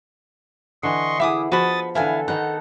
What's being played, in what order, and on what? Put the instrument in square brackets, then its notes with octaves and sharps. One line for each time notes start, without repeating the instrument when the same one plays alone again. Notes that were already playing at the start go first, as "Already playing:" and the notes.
[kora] D3 E3 [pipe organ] D#5 C6 C#6
[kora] B3 G#4 [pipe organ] E4 [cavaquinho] E5 D6 D#6
[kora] F3 B4 D#5 [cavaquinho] F#4 B5 [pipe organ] D#6 A6
[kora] D3 E3 [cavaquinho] E4 F5 G#5 [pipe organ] A4
[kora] D#3 B3 D#4 [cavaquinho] F#5